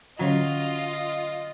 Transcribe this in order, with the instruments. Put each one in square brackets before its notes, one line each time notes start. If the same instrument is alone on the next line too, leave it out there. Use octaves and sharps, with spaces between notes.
[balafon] D3 C#4 C#5 [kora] F#3 [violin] F4 [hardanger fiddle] D#5